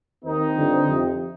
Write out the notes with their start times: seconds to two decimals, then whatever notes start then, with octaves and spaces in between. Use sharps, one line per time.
0.24 D#2 D#3 C4 D#4
0.55 G2 D3 F3
0.86 F2 C3 F3